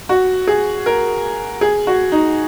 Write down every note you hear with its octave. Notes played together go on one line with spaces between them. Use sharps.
F#4
G#4
A#4
G#4
F#4
D#4